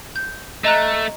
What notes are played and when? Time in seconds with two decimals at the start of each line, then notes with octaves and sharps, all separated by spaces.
0.16 G6
0.64 A3 D#5 A#5 F#6